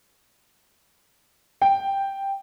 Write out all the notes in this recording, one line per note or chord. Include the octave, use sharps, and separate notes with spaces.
G5